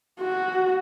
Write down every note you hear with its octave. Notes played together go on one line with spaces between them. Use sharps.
F#4